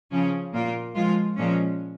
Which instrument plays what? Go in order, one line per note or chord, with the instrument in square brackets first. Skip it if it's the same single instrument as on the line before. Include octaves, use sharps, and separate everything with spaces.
[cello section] C#3 F3 C#4
A#2 A#3 F4
F3 G#3 F4
A#2 F3 G#3 C#4